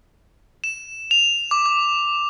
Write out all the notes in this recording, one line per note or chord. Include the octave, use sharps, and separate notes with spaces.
E7
F7
D6
D6